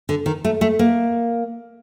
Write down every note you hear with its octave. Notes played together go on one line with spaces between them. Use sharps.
D3
D#3
A3
A3
A#3